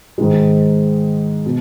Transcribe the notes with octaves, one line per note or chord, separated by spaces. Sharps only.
G#2 D#3 G#3
B2